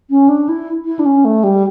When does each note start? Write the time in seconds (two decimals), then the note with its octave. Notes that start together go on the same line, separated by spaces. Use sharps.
0.10 C#4
0.29 D4
0.49 E4
0.86 E4
0.99 D4
1.06 C#4
1.25 A3
1.44 G3